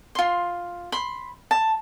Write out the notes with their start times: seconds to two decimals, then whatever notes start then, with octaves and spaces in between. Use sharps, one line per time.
0.15 F4 C6
0.92 B5 C6
1.51 A5